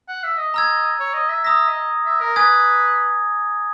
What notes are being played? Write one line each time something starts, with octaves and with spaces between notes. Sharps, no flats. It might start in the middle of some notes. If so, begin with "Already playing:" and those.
F#5
E5
D#5
A#5 E6 G#6
C#5
D#5
E5
E5 A#5 D#6 A#6
D#5
E5
A#4
B4 G#5 D#6 G#6